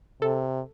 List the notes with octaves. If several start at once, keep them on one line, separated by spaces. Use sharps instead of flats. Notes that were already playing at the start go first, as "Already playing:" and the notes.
C3 A4